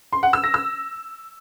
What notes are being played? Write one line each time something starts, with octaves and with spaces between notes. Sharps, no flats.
C6
F#5
E6
A#6
E6